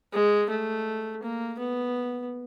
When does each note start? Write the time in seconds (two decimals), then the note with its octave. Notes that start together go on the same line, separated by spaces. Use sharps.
0.13 G#3
0.49 A3
1.22 A#3
1.59 B3